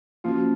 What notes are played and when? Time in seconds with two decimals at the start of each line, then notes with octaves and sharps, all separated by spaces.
0.24 F3 A#3 C#4 F4 F#4